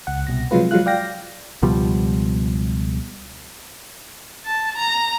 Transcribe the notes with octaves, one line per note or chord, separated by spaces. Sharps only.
C#2 F#5
C2 B2 A#6
C3 F3 F#3 G#3 F4 B4
F3 F#3 G#3 F4 F5 F#6
D5 F5 G5 A#6
C#2 B2 F3 G3
A5
A#5